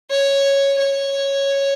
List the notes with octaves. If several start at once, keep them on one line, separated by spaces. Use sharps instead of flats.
C#5
C#5